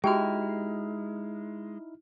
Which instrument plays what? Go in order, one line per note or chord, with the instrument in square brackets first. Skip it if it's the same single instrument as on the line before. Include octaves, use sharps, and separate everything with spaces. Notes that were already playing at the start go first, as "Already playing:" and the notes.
[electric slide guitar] G#3 [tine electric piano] D#4 E4 F6 [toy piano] F#4 G4 [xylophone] G5